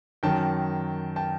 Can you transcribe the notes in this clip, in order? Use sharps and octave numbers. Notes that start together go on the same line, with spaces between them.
F#2 D#3 F#3 G5 A5
G5 A5